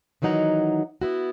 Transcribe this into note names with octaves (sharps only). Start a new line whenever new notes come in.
D#3 E3 F#3 D#4 F#5 A#5
B3 E4 F#4